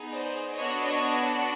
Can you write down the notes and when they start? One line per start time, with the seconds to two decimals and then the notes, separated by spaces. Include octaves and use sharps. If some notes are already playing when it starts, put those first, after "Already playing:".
Already playing: B3 D#4 G#4
0.11 C5 D5
0.55 B3 D4 F#4 A4 C#5 D#5
0.84 C#5 D#5